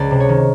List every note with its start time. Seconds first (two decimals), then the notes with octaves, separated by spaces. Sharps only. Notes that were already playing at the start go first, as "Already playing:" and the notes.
Already playing: C#2 D5
0.11 C3
0.20 C#5
0.29 D#3